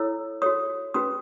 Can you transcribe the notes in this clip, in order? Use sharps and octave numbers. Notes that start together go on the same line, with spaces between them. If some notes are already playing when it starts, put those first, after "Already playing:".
Already playing: E4 A4 C#5 E6
F#4 A4 C#5 D#6
C#4 F#4 B4 D#6